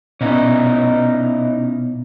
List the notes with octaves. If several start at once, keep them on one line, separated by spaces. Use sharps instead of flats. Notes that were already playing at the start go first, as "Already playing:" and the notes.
B2 B3 C#4 D#4 E4